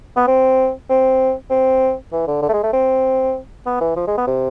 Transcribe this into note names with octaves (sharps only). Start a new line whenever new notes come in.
B3
C4
C4
C4
E3
D3
D3
A3
G#3
A3
C4
B3
E3
F3
G#3
B3
C3